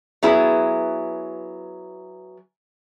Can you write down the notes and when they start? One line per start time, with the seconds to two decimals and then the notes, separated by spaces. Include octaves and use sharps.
0.23 F#3 B3 E4 G#4